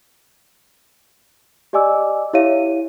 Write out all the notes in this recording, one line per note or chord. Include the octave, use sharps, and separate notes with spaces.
G4 D5 D#5 G#5 D6 E6
E4 G4 C#5 E5 F5 D#7